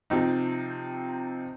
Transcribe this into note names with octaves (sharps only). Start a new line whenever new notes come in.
C3 F3 C4 D#4